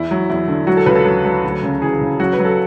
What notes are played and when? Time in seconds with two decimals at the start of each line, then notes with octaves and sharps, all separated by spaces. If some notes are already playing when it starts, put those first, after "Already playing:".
Already playing: E2 E4
0.11 F#3
0.30 E2 E4
0.48 D3
0.67 F#3 F#4
0.77 A4
0.86 C#2 B4
0.95 A4
1.05 F#3
1.25 F#3
1.43 D2
1.63 C#3
1.82 E3 G#4
2.01 C#3
2.19 F#3 F#4
2.33 B4
2.39 F#3
2.45 A4